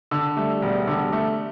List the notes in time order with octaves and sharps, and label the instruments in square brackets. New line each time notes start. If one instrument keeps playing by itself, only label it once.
[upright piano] D3
[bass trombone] G3 [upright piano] A3
[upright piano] E1
D3
A3